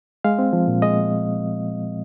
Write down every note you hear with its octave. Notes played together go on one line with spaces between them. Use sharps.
G#3 F5
C4
F3
A#2
G#3 D#5